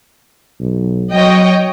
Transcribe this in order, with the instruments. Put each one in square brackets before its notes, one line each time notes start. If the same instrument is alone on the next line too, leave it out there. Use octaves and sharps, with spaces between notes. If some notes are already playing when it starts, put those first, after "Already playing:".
[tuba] B1
[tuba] F#3 [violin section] C#5 D#5 G5